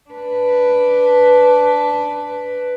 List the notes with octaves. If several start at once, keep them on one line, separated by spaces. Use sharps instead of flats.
D4 B4